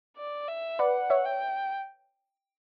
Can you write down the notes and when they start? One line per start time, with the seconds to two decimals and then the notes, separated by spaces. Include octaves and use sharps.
0.17 D5
0.48 E5
0.79 B4 D5 F#5
1.10 C#5 E5
1.25 G5